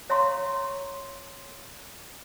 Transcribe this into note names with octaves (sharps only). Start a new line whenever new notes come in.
C#5 E5 F5 A#5 C6 C#6